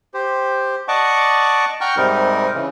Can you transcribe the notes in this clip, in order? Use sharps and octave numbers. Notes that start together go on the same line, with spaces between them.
G4 C5
D5 D#5 F#5 A5 C#6 D6
F#5 G5 A#5 C#6 F6 G6
G#2 C3 G3 D#4 A#4
C#3 E3